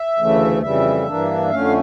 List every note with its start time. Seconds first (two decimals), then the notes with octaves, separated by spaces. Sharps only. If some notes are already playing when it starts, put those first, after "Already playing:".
Already playing: E5
0.18 D2 C#3 E3 A3
0.62 F2 C#3 E3 G3 E5
1.06 G2 E3 A#3 D4
1.50 F2 D3 A3 C#4 F5